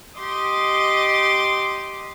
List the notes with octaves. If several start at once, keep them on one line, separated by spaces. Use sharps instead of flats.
G4 D#5 C6 D6